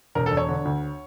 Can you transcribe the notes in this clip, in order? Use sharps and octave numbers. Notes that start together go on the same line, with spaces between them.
E1 A#4
A4
E1
C#5
D3
D2